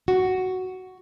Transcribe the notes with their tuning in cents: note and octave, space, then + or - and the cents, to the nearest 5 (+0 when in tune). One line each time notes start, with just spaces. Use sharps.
F#4 +5